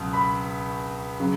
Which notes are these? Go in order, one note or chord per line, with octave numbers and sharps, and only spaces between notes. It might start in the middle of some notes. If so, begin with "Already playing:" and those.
Already playing: C#2 B2 F#3
B5
C#3 F#3